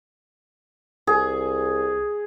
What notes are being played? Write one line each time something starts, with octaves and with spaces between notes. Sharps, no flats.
C2 G#4